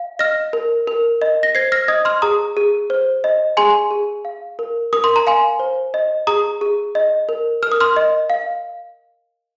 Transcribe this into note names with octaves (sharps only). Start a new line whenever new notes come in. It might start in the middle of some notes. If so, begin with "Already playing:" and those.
Already playing: F5
D#5 F6 A#6
A#4
A#4
D#5
A#6
C5 G#6 C7
F6 A#6
D#5 D#6 G#6
C6 F6
G#4 A#5 D#6
G#4
C5
D#5
G#4 G#5 C6
G#4
F5
A#4
A#4 D#6
C6
A#5
F5 G#5 C6
C5
D#5
G#4 A#5 D#6
G#4
D#5
A#4
A#4 F6
D#6
C6 F6
D#5
F5